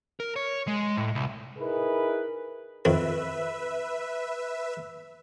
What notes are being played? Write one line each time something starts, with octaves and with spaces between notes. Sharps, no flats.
A#4
C#5
G#3
A2
C2
D#4 E4 G#4 A#4 B4
F2 D#3 B4 E5